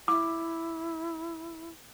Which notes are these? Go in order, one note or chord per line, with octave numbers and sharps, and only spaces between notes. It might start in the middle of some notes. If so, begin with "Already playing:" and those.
E4 D6